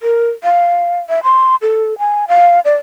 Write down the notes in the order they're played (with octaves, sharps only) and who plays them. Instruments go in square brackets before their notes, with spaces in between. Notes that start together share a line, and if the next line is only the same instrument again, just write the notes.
[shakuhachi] A#4
F5
E5
C6
A4
G#5
F5
D5